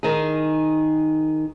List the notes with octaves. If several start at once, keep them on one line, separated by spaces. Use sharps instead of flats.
D#3 G#4